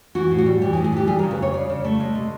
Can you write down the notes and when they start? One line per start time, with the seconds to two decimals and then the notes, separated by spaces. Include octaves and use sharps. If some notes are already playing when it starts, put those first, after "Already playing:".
0.15 E3 F#4
0.31 A2
0.38 F#4
0.46 G3
0.62 E3 G4
0.73 G#4
0.77 A2
0.84 G#4
0.92 E3 G4
1.07 G3 G#4
1.19 C#3 A#4
1.31 B4
1.38 G3 C#5
1.54 C#3 D5
1.70 C#3
1.85 A3
2.00 G#3
2.15 C3